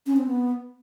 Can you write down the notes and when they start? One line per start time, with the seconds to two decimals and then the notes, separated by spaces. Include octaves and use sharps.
0.06 C#4
0.16 C4
0.27 B3